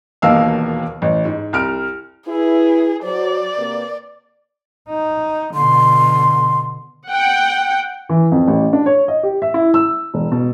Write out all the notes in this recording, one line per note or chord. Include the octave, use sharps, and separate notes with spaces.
E1 D#2 B2 A#3 F5 E6
A1
G#2
C2 F6 D7
E4 G#4 B4
F#3 F#4 C5 D5
C3 A#3 B4
D#4
B2 D3 C6
F#5 G5
E3
F2
A1
D4
C#5
D#5
G4
E5
E4
E6
E1
B2